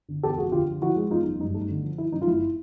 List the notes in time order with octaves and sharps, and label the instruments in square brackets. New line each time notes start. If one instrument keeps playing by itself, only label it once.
[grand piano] D3
E2 G4 A4
F1 F#4 G#4
D3 F4 G4
F3
F3 E4 F#4
G#3
E2 D#4 F4
F#1
G2 D#4
A3
D3
F3
D#3 E4
F#2 D#4
F4
G1 E4